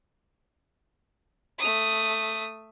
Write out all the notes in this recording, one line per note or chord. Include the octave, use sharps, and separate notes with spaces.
A3 D#6